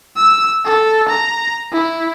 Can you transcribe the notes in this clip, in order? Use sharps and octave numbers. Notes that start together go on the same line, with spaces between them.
E6
A4
A#5
E4